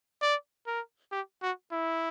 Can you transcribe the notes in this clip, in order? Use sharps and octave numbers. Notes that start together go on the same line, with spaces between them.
D5
A#4
G4
F#4
E4